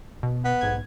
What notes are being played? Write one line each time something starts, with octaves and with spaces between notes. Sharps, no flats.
B2
B3
B1 G#2 G#6